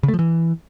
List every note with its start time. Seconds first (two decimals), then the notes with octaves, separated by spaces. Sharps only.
0.03 C#3
0.08 A3
0.14 F3
0.19 E3